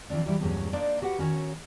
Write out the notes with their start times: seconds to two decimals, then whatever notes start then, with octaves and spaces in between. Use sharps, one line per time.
0.10 E3 F3 C4 D4
0.24 E3 F#3 G3 E4
0.40 E2 G2 A#2 F#3 G#3 C#4
0.73 A#3 D4 D#4 C5 D5
1.02 F#4 G4 B4 F#5
1.18 D#3 C#4 F#4 C#5